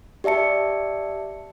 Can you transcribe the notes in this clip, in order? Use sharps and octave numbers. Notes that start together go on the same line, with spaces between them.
G4 D5 E5 A5 C#7